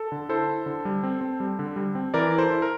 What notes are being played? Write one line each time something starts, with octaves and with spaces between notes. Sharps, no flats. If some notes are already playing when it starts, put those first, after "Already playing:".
Already playing: A4
D3
E4 A4 C5
E4
D3
G3
C4
C4
G3
D3
G3
C4
E3 A#4 D5
E4
A4 C5
E4
A#4